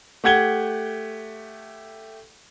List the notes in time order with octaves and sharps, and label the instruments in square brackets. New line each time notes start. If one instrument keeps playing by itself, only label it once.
[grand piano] A3 G4 F#5 G#6 G7